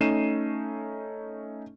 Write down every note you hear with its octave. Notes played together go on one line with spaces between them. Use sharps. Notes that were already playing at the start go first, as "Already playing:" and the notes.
A3 C#4 D#4 C7 D#7 E7